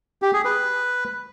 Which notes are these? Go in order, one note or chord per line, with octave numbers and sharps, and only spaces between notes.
G4
G#4
B4